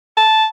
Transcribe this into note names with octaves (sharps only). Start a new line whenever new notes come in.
A5